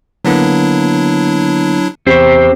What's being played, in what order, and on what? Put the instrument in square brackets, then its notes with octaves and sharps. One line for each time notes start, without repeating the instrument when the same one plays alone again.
[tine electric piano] D3 A#3 B3 [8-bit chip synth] F#3 D4 E4
[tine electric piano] E2 B5 C#6 [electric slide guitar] C4 G4 C5